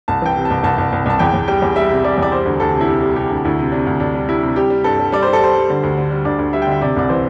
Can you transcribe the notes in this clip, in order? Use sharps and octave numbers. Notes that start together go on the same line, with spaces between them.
C2 A5
E3 G5
C3
C2 A5
C2 A5
C2
C2
C2 A5
E2 G5
E2
G3 G5
E2
G3 E5
C3
G3 D5
E2 D5
G3 C5
D2
D2 A4
C3
E4
C3 G4
G3
C3 G4
D2
D2 E4
C3
C3 D4
D2
D2 D4
G3
G3 E4
C3
G3 G4
G3
G2 A4
G3
G3 D5
G3 C5
A4
G3 C5
G3
D3
D2
D3
G3
D2 D5
D2
G3 E5
G5
D3 E5
C3 D5
C2 D5
E3 C5